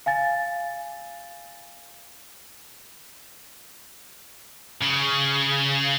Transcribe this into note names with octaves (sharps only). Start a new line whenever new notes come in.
F5 G#5 A6
C#3